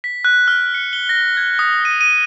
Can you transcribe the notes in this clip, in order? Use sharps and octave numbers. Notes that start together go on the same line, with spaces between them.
B6
F#6
F6
C#7
G7
A#6
G#6
D#6
D#7
D#7